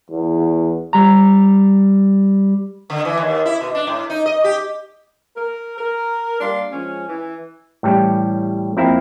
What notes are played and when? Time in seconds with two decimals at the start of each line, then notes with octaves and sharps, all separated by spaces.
0.10 E2
0.93 G3 A#5
2.90 D3
3.05 E3
3.17 D#2
3.45 E4
3.61 B2
3.75 D4
3.87 A2
4.10 D#4
4.26 D#5
4.44 G4
5.36 A#4
5.78 A#4
6.40 G3 A#3 D4 F5 C6
6.71 F3 G#3 C#4
7.08 E3
7.83 A2 E3 G3 C#4 G4
8.77 F2 A#3 C4 E4 A#4 E5